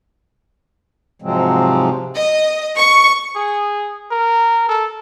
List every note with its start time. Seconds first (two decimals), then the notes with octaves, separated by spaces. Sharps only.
1.22 G#2 C3 F3 F#3 G#3 C4
2.15 D#5
2.77 C#6
3.35 G#4
4.11 A#4
4.69 A4